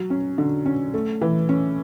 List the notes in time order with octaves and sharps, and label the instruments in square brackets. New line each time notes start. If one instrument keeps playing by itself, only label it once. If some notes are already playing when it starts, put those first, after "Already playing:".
Already playing: [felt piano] F#3
C#4
D3
C#4
A3
E3
C#4